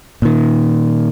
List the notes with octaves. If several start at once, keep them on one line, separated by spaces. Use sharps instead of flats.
A#2 D#3